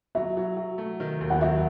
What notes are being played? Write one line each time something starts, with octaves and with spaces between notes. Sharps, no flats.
F#3 E5
F#3
F#3
A3
D#3
D#2
F#5
F#3 E5